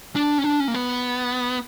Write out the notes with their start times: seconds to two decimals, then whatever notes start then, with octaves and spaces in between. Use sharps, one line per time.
0.16 D4
0.38 C#4
0.44 D4
0.60 C#4
0.68 A#3
0.74 B3